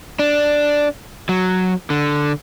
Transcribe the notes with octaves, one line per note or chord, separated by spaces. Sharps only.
D4
F#3
D3